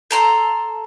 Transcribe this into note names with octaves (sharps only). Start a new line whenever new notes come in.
A4 A#5 C6